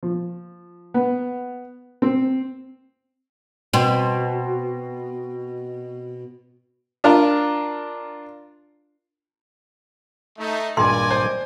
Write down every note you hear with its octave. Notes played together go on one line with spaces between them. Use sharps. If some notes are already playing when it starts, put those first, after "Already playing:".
F3
B3
C4
B2 C4
D4 F4 A#4
A3 D#4
G#1 G2 A#2 D5 D#5 G#5 C6
C5